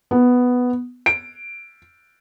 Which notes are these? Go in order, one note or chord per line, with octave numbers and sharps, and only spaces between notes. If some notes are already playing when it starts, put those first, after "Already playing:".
B3
D7